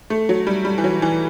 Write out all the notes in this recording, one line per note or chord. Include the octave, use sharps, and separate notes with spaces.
A3
F#3
G3
G3
E3
F#3
E3